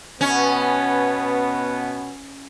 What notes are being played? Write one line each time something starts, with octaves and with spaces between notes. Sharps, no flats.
B2 B3 C#4